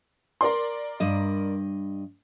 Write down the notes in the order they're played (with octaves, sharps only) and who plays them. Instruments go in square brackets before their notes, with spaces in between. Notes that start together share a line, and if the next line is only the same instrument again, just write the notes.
[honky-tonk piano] A#4 D5 C6
[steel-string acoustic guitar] G2 D#5